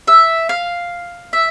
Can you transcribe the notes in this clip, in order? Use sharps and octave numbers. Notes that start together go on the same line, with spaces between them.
E5
F5
E5